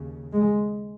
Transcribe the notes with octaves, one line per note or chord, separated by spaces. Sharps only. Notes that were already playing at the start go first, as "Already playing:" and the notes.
Already playing: D#2 C#3
G#3